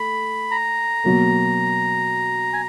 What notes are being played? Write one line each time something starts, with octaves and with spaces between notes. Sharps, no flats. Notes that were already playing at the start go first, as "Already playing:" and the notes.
Already playing: A3 B5
A#5
B2 F#3 A#3
G#5